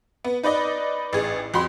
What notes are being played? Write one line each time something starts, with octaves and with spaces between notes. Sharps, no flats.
B3
D#4 B4 D5 D#5
A1 G#4
F2 F#4 B5 C6